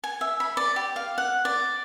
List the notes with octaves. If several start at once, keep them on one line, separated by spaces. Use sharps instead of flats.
G#5
E5
B5
D5
G4
F5
F#5
D5